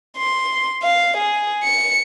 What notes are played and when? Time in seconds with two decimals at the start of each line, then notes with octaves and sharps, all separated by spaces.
0.17 C6
0.83 F5
1.17 G#4
1.64 C#7